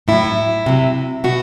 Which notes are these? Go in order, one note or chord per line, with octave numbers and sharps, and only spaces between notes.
A2 F#3 E4
C3 F#3
B2 F#4